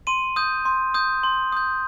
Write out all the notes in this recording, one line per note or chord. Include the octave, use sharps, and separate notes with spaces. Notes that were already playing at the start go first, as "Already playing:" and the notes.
C6 D#7
D#6 G6
C6
D#6 G6
C6
D#6 G6